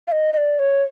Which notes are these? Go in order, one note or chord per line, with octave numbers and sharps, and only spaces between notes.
F5
D#5
D#5
D5
C#5